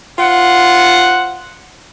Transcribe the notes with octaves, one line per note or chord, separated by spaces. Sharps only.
F4 C5 F#5